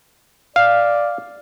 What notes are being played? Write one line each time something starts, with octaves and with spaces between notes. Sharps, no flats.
D5 F5